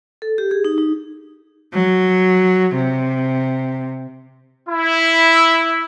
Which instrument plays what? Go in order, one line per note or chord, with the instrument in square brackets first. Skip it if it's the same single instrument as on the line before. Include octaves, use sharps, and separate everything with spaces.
[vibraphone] A4
G4
G#4
D#4
D#4
[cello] F#3
C3
[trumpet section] E4